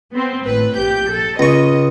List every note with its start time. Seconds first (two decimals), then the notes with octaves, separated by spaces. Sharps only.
0.12 B3 C4
0.44 G#1 A2 B4
0.77 A#1 G4 G6
1.09 A4
1.39 C#2 D#5 C#6